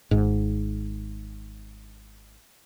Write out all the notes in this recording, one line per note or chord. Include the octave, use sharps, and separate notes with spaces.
G#1 G#2